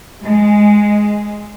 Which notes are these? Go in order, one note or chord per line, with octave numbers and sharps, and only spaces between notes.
G#3